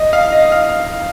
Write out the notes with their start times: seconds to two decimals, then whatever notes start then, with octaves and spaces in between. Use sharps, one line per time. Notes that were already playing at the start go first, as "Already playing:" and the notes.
Already playing: D#5
0.13 F5
0.32 D#5
0.52 F5